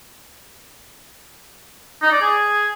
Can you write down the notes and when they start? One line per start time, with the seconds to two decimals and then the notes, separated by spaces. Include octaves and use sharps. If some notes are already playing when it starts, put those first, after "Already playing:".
2.02 D#4
2.12 D5
2.21 G#4